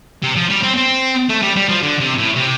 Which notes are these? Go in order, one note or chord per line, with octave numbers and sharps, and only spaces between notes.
C3
F3
G3
C4
C4
A3
G3
G3
F3
D3
C3
A2
C3